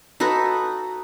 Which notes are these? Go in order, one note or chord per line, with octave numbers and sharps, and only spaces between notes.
D#4 F#4 A4 B4